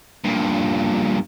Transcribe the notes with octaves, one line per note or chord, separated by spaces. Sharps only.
G2 A#2